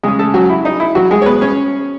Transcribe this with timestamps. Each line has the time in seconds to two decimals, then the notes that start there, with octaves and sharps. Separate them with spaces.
0.03 C#3 G#3 C#4 G#4
0.19 A3 A4
0.34 F#3 F#4
0.50 E4
0.65 D#4
0.80 E4
0.95 F#3 F#4
1.11 G#3 G#4
1.22 C#5
1.26 B3 B4
1.41 C#4 C#5